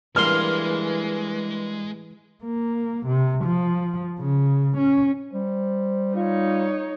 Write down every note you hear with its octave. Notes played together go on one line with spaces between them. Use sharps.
G2 E3 G#3 A#3 C6 F6
A#3
C3
F3
C#3
C#4
G3 C5
D#4 F4 C#5